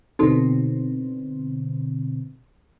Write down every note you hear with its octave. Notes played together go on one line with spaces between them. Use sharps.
B2 D3 C4 D#4 F#4 A4